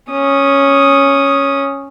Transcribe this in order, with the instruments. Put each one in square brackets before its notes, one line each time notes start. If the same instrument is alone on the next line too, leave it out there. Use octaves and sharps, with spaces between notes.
[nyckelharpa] C#4 D#6